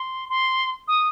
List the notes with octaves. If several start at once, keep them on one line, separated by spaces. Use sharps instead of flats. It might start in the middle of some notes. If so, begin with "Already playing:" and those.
Already playing: C6
C6
D#6